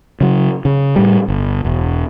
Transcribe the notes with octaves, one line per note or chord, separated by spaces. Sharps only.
C#3 F#3
C#3
A2 G3
G1
E1